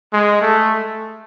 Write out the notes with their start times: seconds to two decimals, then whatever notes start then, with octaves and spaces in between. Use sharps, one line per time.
0.13 G#3
0.41 A3